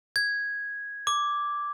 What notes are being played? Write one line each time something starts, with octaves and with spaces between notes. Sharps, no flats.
G#6
D6